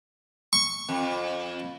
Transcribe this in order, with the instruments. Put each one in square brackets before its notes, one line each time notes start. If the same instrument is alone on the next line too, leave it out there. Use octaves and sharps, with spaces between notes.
[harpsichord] C#6
[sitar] F2